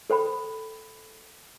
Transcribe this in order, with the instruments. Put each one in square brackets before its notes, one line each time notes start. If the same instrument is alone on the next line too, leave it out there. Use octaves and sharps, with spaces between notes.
[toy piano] A4 C5 G5 B5